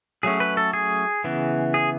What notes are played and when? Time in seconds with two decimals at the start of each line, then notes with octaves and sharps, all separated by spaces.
0.23 F#3 A3 C#4 G#4
0.40 B4
0.57 A4
0.73 G#4
1.24 C#3 E3 B3
1.74 G#4